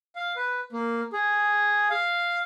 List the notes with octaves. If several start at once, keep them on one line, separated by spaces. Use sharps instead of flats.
F5
B4
A#3
G#4
F5